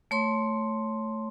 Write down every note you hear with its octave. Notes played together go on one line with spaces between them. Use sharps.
A3 C#5 C6